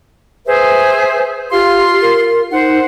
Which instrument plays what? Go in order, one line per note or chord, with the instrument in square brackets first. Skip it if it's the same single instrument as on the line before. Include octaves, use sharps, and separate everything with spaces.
[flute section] G#4 C5 E5 [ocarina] B4
[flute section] F4 F5 C6 [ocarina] G4
[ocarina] A#4
[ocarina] D#4 [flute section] C5 F#5